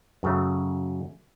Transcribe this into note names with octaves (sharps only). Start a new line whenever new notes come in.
F#2 C#3 A3